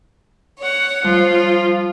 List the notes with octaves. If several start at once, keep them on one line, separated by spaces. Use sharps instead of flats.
C#5 F#5
F3 G3 F4